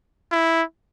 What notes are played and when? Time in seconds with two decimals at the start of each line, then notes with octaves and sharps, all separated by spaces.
0.32 E4